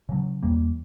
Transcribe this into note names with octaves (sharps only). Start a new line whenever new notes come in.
C#3 F#3
E2 G3 A#3